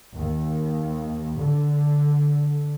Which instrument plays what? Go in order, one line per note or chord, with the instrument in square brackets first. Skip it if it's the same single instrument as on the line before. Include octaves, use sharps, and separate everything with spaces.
[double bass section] D#2
D3